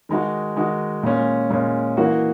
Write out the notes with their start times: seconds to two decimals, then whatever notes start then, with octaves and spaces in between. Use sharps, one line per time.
0.09 D#3 G#3 D#4 F#4
0.56 D#3 G#3 D#4 F#4
1.03 A#2 G#3 C#4
1.50 A#2 G#3 C#4
1.97 E3 A#3 D#4 F#4